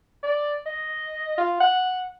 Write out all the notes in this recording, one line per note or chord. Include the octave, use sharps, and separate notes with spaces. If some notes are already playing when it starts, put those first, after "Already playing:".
D5
D#5
F4
F#5